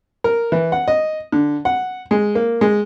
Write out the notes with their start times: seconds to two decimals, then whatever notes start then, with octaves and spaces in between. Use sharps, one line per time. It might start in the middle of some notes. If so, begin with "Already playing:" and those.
0.24 A#4
0.52 E3
0.72 F#5
0.88 D#5
1.32 D3
1.65 F#5
2.11 G#3
2.35 A#3
2.61 G#3